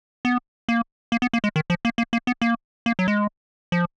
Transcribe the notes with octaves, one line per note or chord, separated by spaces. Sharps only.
B3
A#3
A#3
B3
A#3
G#3
D#3
F3
A#3
A#3
A#3
B3
A#3
A#3
F#3
G#3
F3